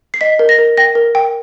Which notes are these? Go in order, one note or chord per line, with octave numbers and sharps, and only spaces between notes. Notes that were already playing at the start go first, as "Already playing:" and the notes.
C7
D#5 B6
A#4
A#6
A#4
G5 A#6
A#4
G5